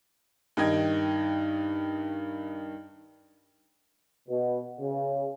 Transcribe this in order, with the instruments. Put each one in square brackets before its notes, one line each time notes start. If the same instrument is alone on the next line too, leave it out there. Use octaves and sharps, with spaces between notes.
[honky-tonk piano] G2 D#3 D#4 D#5 G5 G#6
[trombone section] B2
C#3